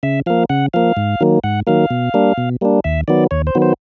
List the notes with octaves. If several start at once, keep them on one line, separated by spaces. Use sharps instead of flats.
C#3 E5
F3 A#3 F5
C#3 F#5
F3 A#3 F5
G#2
D#3 F#3 A#3
G#2 F#5
D#3 F#3 A#3 F5
B2
G3 A#3 D4
B2
G3 A#3 D4
D#2 E5
D#3 F#3 B3 D5
D#2 C#5
C5
D#3 F#3 B3
C5